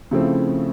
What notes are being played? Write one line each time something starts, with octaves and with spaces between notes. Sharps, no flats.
C#3 F3 A3 C4 E4